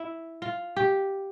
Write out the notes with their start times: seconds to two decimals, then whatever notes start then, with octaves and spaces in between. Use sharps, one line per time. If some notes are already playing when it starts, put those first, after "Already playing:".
Already playing: E4
0.42 F4
0.76 G4